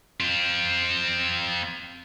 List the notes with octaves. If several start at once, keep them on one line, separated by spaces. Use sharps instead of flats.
C4 F4